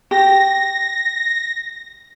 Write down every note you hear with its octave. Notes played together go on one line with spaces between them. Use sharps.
G4 A#6